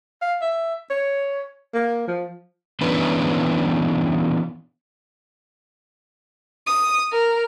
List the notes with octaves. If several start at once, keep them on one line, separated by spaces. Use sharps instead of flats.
F5
E5
C#5
A#3
F3
E3 B3 C#4 D4 B4
D#6
A#4